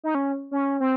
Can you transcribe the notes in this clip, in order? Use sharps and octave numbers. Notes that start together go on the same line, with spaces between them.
D#4
C#4
C#4
C4